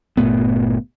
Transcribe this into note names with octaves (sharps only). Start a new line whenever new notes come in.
G1 A#2 A3 B3